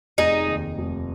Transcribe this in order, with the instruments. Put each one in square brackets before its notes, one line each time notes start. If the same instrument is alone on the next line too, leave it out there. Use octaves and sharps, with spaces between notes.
[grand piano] F1 [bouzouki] D#4 G#4
[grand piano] D#2
F1